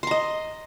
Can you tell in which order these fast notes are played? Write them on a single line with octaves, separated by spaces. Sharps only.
C6 A#5 D#5